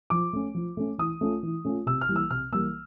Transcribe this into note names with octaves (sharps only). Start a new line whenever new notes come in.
F3 D6
A3 C#4
F3
A3 C#4
E3 D#6
A3 C#4 F4
E3
A3 C#4 F4
C3 E6
F6
E3 G3 A#3
E6
C3 F6
E3 G3 A#3 E6